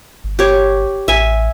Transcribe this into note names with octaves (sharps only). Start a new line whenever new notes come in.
G1
G4 C#5
A1 E5 G#5